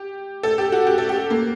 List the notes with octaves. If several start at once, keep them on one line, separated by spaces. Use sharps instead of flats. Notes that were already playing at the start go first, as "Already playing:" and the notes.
Already playing: G4
A4
G4
F#4
G4
A4
G4
A#3